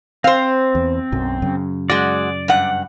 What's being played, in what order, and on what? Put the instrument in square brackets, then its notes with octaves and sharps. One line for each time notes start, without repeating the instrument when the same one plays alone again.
[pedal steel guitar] C4 [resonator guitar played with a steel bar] C5 F5
[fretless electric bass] E2
B1 F#2
F#2 C#3
[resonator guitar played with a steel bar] G#3 F#4 [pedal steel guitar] D5
[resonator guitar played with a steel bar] G2 F#5